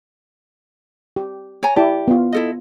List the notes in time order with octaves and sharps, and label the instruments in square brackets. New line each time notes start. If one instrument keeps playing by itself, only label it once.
[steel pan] G4
[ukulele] C#5 G#5 A#5
[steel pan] E4 D5 A5 [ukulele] G4
[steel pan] B3 F4
[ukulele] E4 A4 D#5